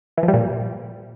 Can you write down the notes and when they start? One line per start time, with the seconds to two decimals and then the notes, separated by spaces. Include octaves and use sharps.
0.18 E3
0.23 F3
0.28 G3
0.34 A#2